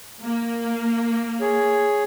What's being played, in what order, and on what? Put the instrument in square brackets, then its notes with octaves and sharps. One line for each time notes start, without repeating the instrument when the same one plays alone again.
[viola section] A#3
[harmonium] G#4 C#5